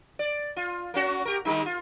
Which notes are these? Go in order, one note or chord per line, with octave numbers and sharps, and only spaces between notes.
D5
F4
A#3 C#4 F#4
G4 A#4
D#3 G3 D#4
F4